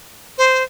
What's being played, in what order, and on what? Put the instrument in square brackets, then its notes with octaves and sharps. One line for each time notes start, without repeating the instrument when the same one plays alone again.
[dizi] C5